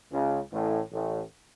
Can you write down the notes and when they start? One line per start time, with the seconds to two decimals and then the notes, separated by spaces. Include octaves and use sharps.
0.11 C#2 C#3
0.51 A1 A2
0.92 A1 A2